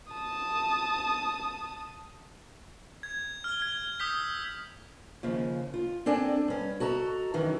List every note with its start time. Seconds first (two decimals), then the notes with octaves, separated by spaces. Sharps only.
0.13 A5 D#6
3.03 G#6
3.44 F6 G7
3.62 G#6
4.00 D#6 E6 G6 B6
5.23 D#2 C#3 F3
5.74 F4
6.06 C4 D4 A4 D5 G5 G#5
6.48 G2 C#4
6.80 F#4 A4 D#5 A#5
7.34 F#2 D#3 E3